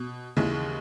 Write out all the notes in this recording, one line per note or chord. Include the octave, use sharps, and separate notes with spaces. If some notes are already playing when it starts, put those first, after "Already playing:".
Already playing: B2
D#2 C#3 E3 G#3